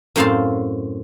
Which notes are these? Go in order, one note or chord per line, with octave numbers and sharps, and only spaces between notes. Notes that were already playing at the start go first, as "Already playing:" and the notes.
F#2 A2 C4 F5 A5 C6